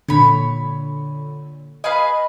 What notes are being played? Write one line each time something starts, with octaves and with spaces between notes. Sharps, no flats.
A#2 D3 C#5 B5
G#4 B4 D#5 F5 B5